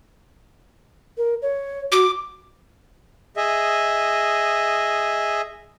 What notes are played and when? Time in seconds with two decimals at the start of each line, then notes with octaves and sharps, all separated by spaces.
1.18 A#4
1.42 C#5
1.92 F#4 D6
3.37 G#4 D#5 E5